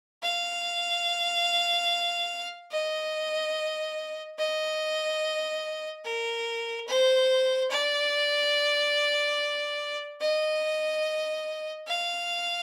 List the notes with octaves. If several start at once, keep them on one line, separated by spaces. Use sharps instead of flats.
F5
D#5
D#5
A#4
C5
D5
D#5
F5